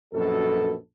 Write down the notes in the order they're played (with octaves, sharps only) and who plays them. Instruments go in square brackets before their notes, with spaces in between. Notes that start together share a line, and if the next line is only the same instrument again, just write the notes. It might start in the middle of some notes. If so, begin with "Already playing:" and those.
[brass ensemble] A#1 F#2 B2 A4